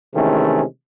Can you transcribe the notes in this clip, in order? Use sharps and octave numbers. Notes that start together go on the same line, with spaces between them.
C3 D#3 E3 G#3 A3 C#4